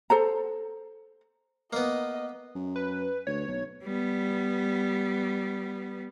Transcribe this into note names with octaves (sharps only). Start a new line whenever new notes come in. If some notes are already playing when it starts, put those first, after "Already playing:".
A4 C5 A#5
A#3 B3 D#5
F#2
B4
D2 C#5
B1
G3 B3